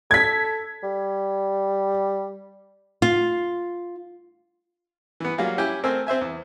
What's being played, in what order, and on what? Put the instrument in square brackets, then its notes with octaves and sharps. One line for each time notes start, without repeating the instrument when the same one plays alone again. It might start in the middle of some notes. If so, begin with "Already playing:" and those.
[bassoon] A4 [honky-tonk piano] G#6 B6
[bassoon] G3
[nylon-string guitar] F4
[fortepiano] E3 B3
F#3 G3 A#3 F4 F#4 G#4
C#4 E4 G4 G5 G#5
A3 C4 A#4 C5 G#5 E6
C4 C5 E5 G#5
E2